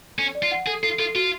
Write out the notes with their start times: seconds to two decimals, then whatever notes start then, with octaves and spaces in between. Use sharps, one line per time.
0.18 C#4 A4
0.35 D5
0.43 F4
0.52 F#5
0.67 G#4 A4
0.83 F4 A4
0.99 F4 A4
1.15 F4 F#4